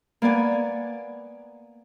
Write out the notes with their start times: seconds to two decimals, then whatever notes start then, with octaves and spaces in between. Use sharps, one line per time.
0.22 A#3 B3 D5 G#5